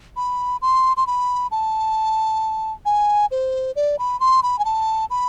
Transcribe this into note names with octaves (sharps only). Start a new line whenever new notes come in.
B5
C6
C6
B5
A5
G#5
C5
D5
B5
C6
B5
G#5
A5
B5